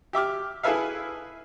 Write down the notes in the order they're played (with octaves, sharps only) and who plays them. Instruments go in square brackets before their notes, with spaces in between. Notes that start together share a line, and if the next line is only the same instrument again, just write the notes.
[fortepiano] G4 E5 D6 F6
E4 G#4 A4 B4 E5 F5